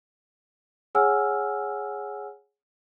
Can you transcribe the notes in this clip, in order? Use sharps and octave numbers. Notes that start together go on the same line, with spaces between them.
G#4 C#5 F#5 G#5 E6 F6